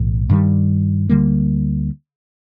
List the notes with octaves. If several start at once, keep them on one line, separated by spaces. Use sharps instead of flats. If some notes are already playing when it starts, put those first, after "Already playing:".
Already playing: B1 A2 E3 A3
G2 D#3 G3
D2 D3 G3 A#3